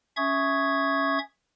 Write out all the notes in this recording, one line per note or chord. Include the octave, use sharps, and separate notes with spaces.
C#4 E5 C#6 D#6 G#6